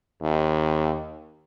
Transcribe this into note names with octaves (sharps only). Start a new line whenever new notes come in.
D#2